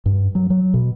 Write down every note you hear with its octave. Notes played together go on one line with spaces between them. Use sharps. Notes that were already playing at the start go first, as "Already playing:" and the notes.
G2
F#3
F#3
B2